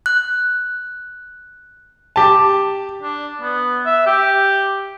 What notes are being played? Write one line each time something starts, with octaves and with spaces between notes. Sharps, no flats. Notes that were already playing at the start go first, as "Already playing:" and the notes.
F#6
G4 A5
D4
B3
E5
G4